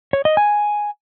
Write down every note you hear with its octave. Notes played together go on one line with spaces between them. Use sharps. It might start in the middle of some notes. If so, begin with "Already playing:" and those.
C#5
D#5
G#5